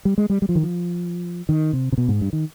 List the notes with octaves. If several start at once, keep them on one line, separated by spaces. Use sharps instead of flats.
G3
G#3
G3
G3
F3
D#3
F3
D#3
C3
C3
B2
G#2
G2
D#3